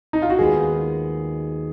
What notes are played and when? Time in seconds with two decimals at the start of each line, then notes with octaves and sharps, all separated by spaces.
0.13 D#4
0.22 F4
0.30 F#4
0.38 D#2 D#3 G#3 B3 F4 G#4